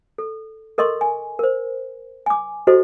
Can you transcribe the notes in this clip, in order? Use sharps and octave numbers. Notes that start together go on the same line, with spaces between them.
A4
A4 A#4 D#5 C6 C#6
G#5
A#4 C5
G#5 D6
E4 F#4 G4 A4 C5 D#5